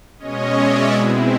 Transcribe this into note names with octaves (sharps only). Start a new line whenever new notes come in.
B2 G#3 C#4 C#5 D#5
D5 E5
B2 G#3 C4 E4